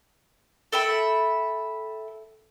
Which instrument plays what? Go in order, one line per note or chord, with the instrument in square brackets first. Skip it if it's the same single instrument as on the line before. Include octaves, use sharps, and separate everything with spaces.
[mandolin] A4 E5 G5 B5